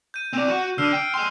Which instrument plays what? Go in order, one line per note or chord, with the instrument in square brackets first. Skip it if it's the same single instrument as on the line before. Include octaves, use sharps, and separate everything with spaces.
[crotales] G6 D#7
[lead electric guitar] C4 D5
F#4 F#5
[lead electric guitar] D3 [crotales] E6 F6 C7
[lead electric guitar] G5
G#5 C6